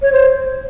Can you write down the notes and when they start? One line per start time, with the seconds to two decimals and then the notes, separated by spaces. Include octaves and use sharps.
0.02 C#5
0.12 C5